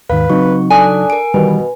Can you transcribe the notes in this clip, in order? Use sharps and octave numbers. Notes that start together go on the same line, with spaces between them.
D#2 G#2 D#3 B4 F5
C#3 F#3 C4 D#4 C#6
D4 A4 G#5 D#6 F#6
A#4 D7
B2 D#3 E3 G3 B4